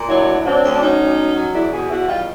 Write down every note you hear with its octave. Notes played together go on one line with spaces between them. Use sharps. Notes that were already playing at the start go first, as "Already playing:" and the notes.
Already playing: A#2
F#3 D4 E4
D2
F#3 C4 D4
D2
D4
F#3 C#4 D#4
D2
F#3
F#3
E2 D4 E4
B2 F#4 G#4
E2 E4 F#4
G3 D#4 F4